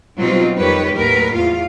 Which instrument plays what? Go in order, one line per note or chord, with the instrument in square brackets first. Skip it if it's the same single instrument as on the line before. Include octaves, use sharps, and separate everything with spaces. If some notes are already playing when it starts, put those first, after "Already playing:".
[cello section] B2 F#3 G3 C4 D#4 F4
F2 D#3 G4 B4 C#5
D#2 A2 F#3 A#4 B4
E2 F4 F5